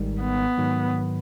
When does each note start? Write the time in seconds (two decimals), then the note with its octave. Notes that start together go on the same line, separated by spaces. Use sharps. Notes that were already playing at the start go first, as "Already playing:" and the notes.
Already playing: G#1 G#2 D#3 G3
0.21 B3
0.58 G#2 D#3 F#3